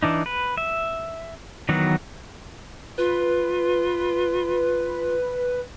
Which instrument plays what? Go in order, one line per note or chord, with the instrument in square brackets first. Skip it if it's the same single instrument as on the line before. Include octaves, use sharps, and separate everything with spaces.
[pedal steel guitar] E3 D4 D#4
B4
E5
D#3 E3 F#3 B3 F#4
[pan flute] F4 [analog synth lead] B4